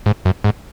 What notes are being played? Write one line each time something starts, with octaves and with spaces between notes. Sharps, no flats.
G#2
F#2
G#2